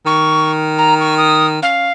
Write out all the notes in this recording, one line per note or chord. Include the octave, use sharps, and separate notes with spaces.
D#3 C#6
A#5
C#6
D#6
C#4 F5